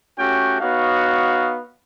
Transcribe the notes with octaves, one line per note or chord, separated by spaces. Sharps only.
A3 C#4 F#4 G4 G5
B3 D#4 F#4 C#5 F5